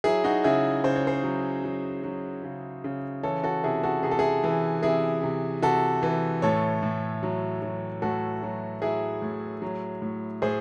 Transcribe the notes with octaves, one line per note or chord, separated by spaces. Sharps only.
F#3 E4 G#4
D#4 F#4
C#3 E4 G#4
C#3 C5
C#5
G#4 C5
F#3
F#3
F#3
C#3
C#3
E3 A4 C#5
F#4 A4
C3 E4 G#4
F#4 A4
C3 G#4
A4
E4 G#4
E3
C3 E4 G#4
C3
C3 F#4 A4
E3
A2 A4 C#5
A2
F#3
F#3
A2 F#4 A4
F#3
F#3 E4 G#4
A2
F#3
A2
A2 G#4 C5